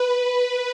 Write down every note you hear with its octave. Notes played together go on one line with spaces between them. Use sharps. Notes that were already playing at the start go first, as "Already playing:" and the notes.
Already playing: B4